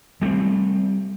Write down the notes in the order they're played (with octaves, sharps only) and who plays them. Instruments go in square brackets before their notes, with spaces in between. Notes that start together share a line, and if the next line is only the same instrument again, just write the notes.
[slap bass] G3 A3 B3 C4